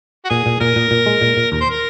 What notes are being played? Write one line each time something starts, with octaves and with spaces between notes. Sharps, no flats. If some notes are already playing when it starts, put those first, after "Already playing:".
F#4
A#2 G#4
A#2
A#2 A#4
A#2
A#2
G#3
A#2
A#2
D#2 A#4
C5
A#4